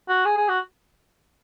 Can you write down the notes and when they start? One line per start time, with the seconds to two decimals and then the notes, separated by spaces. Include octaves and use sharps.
0.09 F#4
0.26 G#4
0.37 G#4
0.49 F#4